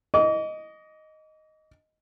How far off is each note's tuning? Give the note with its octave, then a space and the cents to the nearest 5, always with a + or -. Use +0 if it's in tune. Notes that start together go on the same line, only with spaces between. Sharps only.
D#5 +0 D6 -45